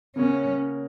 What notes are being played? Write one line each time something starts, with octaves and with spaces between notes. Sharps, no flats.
C#3 A#3 C#4 F#4 C#5